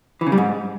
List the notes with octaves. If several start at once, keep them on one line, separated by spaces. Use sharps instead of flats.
E3
C#3
G3
G#2